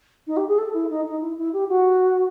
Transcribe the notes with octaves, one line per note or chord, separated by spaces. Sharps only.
D#4
G4
G#4
A4
E4
D#4
D#4
E4
E4
G4
F#4